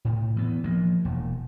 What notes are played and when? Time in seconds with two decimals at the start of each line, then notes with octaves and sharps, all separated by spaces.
0.05 A2
0.36 E3 B3
0.64 F3 A#3
1.05 E1